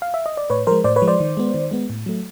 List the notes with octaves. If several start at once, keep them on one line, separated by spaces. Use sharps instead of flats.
F5
E5
D#5
D5
A2 B4 C#5
F3 G#3 A#4 C5
A2 C5 D5
B4 C#5
F3 G#3
C5 D5
D#3
G#3 B3
D#3
G#3 B3
A2
F#3 A3